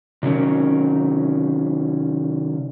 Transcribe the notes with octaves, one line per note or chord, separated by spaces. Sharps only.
C3 D#3 F#3 C#4 A#4